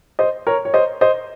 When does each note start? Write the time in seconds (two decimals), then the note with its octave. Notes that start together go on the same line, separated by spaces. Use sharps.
0.19 C5 D#5
0.47 A#4 C#5
0.65 C#5
0.74 C5 D#5
1.01 C5 D#5